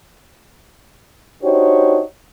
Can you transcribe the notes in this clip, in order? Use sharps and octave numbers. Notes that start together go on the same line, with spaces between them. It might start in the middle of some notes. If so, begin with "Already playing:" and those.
D4 D#4 F#4 G4 C5 C#5